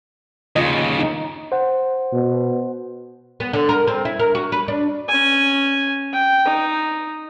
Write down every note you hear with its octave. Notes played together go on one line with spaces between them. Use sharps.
D#2 C#3 F4 D#5
D#4
C5 F#5
B2
B3
D3
A#4
C4
E4
A#4
F#4
B4
D4
C#4 G#5
G5
D#4